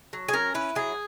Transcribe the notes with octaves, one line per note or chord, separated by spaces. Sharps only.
F#3
G#4
C#4 A#4
E4 B4
F#3 G#4